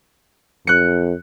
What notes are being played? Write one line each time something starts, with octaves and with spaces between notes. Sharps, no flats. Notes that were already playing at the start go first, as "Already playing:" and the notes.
F2 F#6 C#7